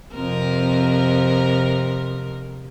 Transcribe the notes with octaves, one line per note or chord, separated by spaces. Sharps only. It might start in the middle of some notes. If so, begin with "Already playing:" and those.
F2 C3 A#4